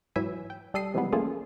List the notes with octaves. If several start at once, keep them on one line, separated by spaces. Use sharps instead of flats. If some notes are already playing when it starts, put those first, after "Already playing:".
G#2 E3 F#3 E4 E5 G#5
G5
G3 A4 D#6 C7
C3 E3 F3 G3 G#3 B3
A3 A#3 C#4 F4 G#4 A4